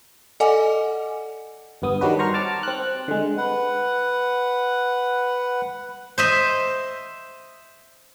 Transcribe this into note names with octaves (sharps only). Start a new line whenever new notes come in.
A4 D5 D#5 F#5 G#5 D6
G1 G2 B3 D#6
D#3 F#3 G3 D4 F#4 B4
C5 A#5 C#6 F6
A5 D6 F6
C4 F#6
D3 G#3
B4 F#5
C5 D#5 E5